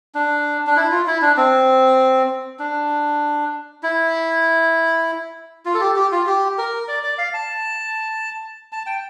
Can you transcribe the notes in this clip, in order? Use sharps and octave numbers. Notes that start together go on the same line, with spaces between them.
D4
D4
E4
F4
E4
D4
C4
D4
E4
F4
A4
G4
G4
F4
G4
A#4
D5
D5
F5
A5
A5
G5